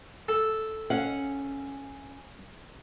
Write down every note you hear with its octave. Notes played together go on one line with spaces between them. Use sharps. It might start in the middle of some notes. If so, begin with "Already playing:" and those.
A4
C#4 F5 F#5